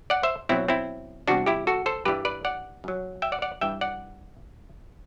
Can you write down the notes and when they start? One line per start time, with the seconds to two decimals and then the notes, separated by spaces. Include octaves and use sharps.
0.10 D5 F#5
0.23 C5 E5
0.49 B2 F#3 C4 E4
0.68 C4 E4
1.28 E2 C3 G3 D4 F#4
1.46 E4 G4
1.67 F#4 A4
1.86 A4 C5
2.05 G2 E3 G3 G4 B4
2.25 B4 D5
2.45 D5 F#5
2.84 F#2 F#3
3.22 E5 G5
3.32 D5 F#5
3.42 D5 F#5
3.61 G2 E3 G3 E5 G5
3.81 D5 F#5